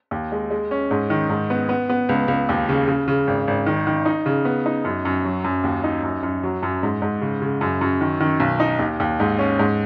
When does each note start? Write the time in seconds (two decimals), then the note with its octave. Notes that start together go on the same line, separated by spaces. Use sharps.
0.11 D#2
0.32 G#3
0.50 G#3
0.71 C#4
0.91 G#2
1.10 D#3
1.29 G#2
1.50 B3
1.69 B3
1.89 B3
2.09 C#2
2.28 C#2
2.49 D#2
2.69 C#3
2.88 C#3
3.08 C#3
3.27 G#1
3.48 G#1
3.66 D#3
3.87 D#3
4.06 D#4
4.26 C#3
4.45 B3
4.66 D#4
4.85 F#2
5.05 F#2
5.25 F#3
5.44 F#2
5.64 D#2
5.84 D#4
6.03 F#2
6.23 F#2
6.43 F#3
6.63 F#2
6.83 G#2
7.02 G#2
7.22 C#3
7.42 C#3
7.61 F#2
7.81 F#2
8.01 D#3
8.20 D#3
8.40 B1
8.60 D#4
8.79 D#2
9.00 D#2
9.20 G#2
9.39 C#4
9.59 G#2